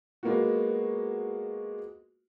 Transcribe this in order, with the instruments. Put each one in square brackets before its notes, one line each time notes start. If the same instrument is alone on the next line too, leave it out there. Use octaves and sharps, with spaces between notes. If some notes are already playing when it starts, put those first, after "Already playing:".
[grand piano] G#3 A#3 B3 F4 F#4